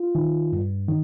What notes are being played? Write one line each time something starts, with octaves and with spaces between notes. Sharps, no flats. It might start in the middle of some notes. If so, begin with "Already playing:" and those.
Already playing: F4
D#3
G2
D#3